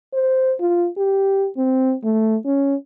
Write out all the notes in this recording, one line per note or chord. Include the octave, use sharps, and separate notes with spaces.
C5
F4
G4
C4
A3
C#4